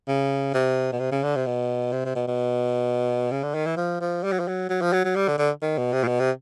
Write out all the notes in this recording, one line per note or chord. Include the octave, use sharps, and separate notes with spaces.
C#3
C3
B2
C3
C#3
D3
C3
B2
C3
C3
B2
B2
C#3
D3
D#3
E3
F3
F3
G3
F#3
F3
F#3
F#3
F3
F#3
F#3
G3
D3
D3
D#3
B2
C3
A#2
B2
C3